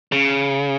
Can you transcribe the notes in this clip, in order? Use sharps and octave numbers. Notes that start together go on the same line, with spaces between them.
C#3